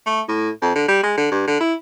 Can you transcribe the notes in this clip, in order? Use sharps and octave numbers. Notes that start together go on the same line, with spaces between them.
A3
A2
F2
D3
G3
G#3
D3
G2
D3
E4